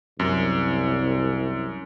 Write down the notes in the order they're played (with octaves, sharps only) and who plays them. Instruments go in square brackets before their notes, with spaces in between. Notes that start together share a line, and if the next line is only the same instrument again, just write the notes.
[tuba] C2 [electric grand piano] F#2